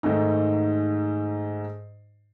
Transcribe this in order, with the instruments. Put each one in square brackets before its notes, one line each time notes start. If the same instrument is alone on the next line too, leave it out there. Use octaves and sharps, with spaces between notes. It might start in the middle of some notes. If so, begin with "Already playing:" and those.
[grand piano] G#2 D#3 A3 D#4